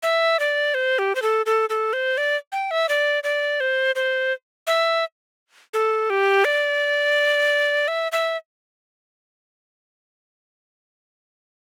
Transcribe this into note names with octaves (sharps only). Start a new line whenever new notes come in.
E5
D5
C5
G4
C5
A4
A4
A4
C5
D5
G5
E5
D5
D5
C5
C5
E5
A4
G4
D5
E5
E5